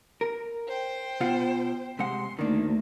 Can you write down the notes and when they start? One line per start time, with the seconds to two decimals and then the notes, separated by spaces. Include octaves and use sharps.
0.21 A#4
0.67 C5 G5
1.21 B2 F4 F#5
1.99 C3 G#3 F#5 C6
2.39 D2 D#3 A#3 D4